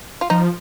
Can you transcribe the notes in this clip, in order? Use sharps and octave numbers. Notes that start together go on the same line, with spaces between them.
F4
F3 D#4